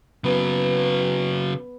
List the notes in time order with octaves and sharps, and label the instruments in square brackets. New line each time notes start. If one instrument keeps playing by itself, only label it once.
[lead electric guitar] C#3 F#3 [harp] B3